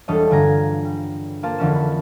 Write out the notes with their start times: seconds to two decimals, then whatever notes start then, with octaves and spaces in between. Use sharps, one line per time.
0.08 E1 G3 D4 A4 C#5 D#5
0.30 G2 D3 F4 G#5 A#5
0.85 G3
1.43 A#3 F4 C5 A5
1.58 F2 D3 E3 C#4 E7
1.75 B5